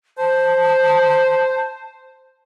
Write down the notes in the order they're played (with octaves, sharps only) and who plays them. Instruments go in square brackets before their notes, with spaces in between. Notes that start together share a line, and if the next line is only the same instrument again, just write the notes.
[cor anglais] C5 [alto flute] A5